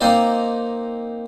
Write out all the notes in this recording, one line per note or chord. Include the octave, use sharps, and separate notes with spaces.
A#3 C4 D#4 D5